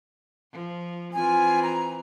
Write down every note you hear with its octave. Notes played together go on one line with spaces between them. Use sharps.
F3
E3 C4 F4 G#5
A#5